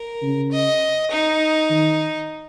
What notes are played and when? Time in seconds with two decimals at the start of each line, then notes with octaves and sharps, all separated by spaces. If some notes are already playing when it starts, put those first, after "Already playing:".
Already playing: A#4
0.23 C#3
0.51 D#5
1.11 D#4
1.70 D#3